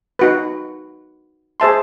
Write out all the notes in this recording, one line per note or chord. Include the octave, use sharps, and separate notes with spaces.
D#4 F#4 B4
G#4 C5 E5 A5 C6